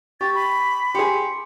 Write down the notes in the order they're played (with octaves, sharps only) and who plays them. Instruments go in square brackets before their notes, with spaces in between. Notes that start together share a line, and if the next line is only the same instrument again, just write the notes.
[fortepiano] G4 [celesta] C#6 [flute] A6
[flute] B5
[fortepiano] G4 G#4 [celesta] C6 C#7